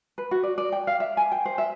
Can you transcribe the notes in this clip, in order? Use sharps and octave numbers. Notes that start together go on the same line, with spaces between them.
B4
F#4
D5
D5
G5
F5
E5
G#5
G5
C5
E5